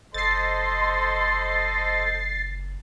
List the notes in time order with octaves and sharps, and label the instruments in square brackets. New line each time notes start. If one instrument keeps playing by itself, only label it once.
[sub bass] F#1 [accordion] A4 C5 D#5 [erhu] C6 [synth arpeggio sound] A6 C7